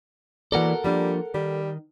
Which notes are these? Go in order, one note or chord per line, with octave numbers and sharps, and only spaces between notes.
B2 E3 A#3 A4 A#4 D5 F#5
F3 G3 A#3 D4
D#3 G3